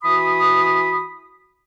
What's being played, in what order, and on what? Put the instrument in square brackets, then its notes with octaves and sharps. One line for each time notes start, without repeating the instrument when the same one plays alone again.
[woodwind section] E3 F#4 B5 D#6